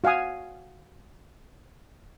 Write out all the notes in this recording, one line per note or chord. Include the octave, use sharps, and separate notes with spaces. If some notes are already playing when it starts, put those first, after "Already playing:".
F#4 F5 F#5 G#5 D#6